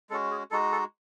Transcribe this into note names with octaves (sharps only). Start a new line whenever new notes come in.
G#3 C#4 F#4 A4
G#4
G#3 D#4 F#4 A4
A4